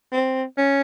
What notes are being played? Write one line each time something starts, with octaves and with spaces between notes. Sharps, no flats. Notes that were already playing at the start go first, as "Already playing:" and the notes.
C4
C#4